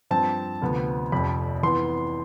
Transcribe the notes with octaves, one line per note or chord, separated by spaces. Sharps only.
G2 F3 C4 A5
D2 C3 F3 B3
F1 F2 C3 F3 B5
F2 E3 B3 C6